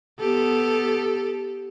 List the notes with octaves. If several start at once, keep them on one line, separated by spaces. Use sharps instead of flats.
B3 G4 A4